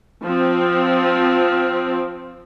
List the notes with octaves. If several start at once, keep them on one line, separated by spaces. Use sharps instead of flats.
F3 C4